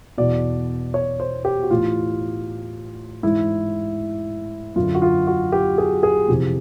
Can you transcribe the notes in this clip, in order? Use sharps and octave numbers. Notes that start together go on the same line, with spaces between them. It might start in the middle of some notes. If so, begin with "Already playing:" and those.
E2 B2 D5
C#5
C5
G4
F#4
A2 E3 F4
G#2 E3 E4
F#2 D3 F4
F#4
F4
F#4
G4
G#4
G#4
F2 C3 E3